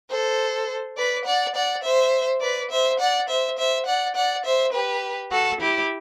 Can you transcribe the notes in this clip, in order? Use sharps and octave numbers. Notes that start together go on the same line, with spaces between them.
A4 C5
B4 D5
D5 F#5
D5 F#5
C5 E5
B4 D5
C5 E5
D5 F#5
C5 E5
C5 E5
D5 F#5
D5 F#5
C5 E5
G4 B4
F#4 A4
E4 G4